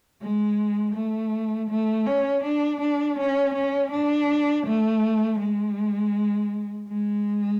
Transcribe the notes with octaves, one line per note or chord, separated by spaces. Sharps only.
G#3
A3
A3
C#4
D4
D4
C#4
C#4
D4
A3
G#3
G#3